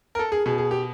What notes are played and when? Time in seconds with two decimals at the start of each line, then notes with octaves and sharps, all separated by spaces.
0.15 A#4
0.19 A4
0.32 G#4
0.46 B2 G#4
0.58 G#4
0.71 G4